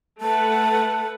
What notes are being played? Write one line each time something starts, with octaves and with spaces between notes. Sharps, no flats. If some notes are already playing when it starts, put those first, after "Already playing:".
A3 B4 F#5 A5